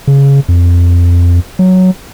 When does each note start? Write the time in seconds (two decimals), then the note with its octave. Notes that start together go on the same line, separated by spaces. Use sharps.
0.07 C#3
0.49 F2
1.59 F#3